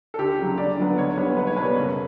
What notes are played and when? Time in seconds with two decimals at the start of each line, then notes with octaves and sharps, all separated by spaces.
0.14 A4
0.18 D2 G4
0.39 C#3 F#3
0.58 D2 D5
0.77 D3 F#3 B3
0.98 D2 C#5
1.17 D3 G3 B3
1.36 B1 B4
1.47 C#5
1.56 B2 G3 B4
1.76 F#1